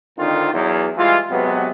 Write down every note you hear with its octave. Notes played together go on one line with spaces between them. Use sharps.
G#1 D3 D#3 C4 D#4 F4
E2 F#3
E3 G3 G#3 F4
C3 F#3 G#3 B3